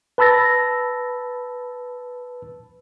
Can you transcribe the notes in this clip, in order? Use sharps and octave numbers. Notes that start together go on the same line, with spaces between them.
B4 A5 B5 E6 A6 A#6